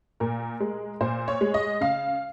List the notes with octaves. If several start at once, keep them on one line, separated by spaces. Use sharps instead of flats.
A#2 A#4
G#3
A#2 C5
C#5
G#3
D#5
C#3 F5